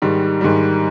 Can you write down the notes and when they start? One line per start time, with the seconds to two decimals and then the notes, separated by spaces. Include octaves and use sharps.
0.02 G#2 D#3 G3
0.41 G#2 D#3 G3